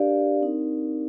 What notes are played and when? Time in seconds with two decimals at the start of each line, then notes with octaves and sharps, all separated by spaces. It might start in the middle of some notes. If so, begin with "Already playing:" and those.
Already playing: D4 G4 A#4 D5 F5
0.41 C4 D#4 A#4